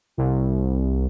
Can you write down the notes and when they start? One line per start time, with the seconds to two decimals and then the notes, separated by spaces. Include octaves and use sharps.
0.17 C2